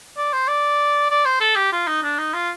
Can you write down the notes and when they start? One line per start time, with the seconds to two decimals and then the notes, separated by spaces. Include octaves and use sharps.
0.17 D5
0.33 C5
0.48 D5
1.10 D5
1.25 C5
1.41 A4
1.56 G4
1.72 F4
1.87 D#4
2.03 D4
2.18 D#4
2.34 F4